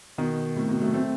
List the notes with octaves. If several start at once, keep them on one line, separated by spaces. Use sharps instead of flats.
B2 D#3
A2 C3
B2
F#3 A3
A3 C4